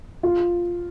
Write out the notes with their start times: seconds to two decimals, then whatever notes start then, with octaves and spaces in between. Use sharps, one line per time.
0.23 F4